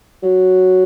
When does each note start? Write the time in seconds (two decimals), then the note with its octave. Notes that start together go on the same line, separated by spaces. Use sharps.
0.23 F#3